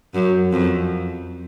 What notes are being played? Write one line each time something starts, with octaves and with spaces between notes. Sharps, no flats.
F#2
F2